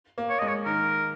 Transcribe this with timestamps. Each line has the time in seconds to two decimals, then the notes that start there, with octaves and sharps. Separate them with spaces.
0.18 A#3
0.29 C#5
0.39 G#3 D#5
0.48 C#5
0.65 D#3 A#4